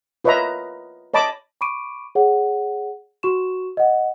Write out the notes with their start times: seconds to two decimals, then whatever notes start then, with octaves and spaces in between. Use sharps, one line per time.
0.24 F4 B4 C#5 D#5 E5 A#5
1.14 C#5 D#5 A5 B5 D6
1.61 B5 C#6 D6 D7 D#7
2.15 G#4 C#5 F#5
3.23 F#4 C#6 E7
3.77 D#5 F#5